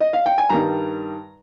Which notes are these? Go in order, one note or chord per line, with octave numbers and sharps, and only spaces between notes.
D#5
F5
G5
G#5
G2 D#3 G3 A#5